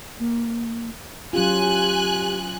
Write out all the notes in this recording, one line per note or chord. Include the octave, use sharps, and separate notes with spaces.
A#3
F#3 C#4 F4 G4 G#5 F#6